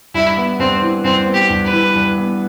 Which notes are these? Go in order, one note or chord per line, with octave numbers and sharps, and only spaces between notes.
G2 E4
B3
G2 C4
E3
G2 C4
B3
G4
G2
B4
E3
G2
B3